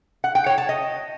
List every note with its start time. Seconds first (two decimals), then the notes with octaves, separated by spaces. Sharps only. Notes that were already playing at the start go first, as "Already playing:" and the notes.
0.24 F#5
0.35 G5
0.46 C#5
0.58 A5
0.69 D#5